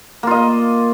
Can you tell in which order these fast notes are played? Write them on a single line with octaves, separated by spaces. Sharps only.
A#3 F4 D#5